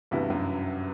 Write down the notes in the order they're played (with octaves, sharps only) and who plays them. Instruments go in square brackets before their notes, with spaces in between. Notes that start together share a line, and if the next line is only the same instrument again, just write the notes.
[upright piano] D2 C3 E3 B3 E4 [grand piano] G2
[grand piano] F#2